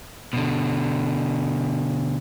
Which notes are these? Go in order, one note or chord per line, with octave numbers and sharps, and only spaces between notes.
B2 D3